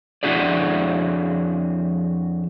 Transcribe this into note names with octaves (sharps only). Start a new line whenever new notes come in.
F2 D4 E4 F#4 G#4 D5